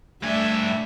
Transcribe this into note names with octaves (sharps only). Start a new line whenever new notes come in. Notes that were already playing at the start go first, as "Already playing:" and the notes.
G2 A3 D4 E5 G#5